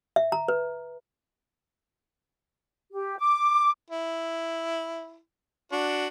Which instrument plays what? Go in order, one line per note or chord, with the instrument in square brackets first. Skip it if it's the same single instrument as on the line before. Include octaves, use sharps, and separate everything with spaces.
[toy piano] E5
A#5
B4
[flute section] G4
D6
[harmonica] E4
D4 F#4